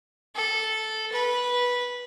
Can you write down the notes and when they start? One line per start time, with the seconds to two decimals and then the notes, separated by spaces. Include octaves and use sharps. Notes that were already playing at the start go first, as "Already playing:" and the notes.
0.35 A4
1.12 B4